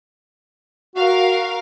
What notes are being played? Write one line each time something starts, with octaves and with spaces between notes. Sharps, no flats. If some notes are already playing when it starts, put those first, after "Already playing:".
F#4 A#4 F5